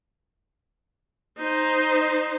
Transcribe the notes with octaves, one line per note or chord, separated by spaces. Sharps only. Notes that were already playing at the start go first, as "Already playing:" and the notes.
D#4 C5